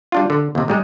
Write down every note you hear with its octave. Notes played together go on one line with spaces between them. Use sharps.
G3 D4 F4
D3
D#2 C3
G#2 G3 G#3